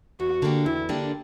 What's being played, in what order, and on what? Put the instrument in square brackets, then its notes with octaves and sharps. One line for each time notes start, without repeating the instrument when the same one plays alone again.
[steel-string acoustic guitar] E2 [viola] F#4
[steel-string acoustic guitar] D3 A#3 D4 G4
[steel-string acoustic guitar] E2 [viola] E4
[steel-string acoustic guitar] D3 A#3 D4 G4